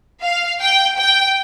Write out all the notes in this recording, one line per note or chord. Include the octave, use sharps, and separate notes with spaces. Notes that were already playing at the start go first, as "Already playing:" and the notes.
F5
G5
G5